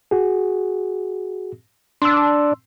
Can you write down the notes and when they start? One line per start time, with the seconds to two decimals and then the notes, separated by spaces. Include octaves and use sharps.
0.11 F#4 G#4
2.02 D4 C6 E6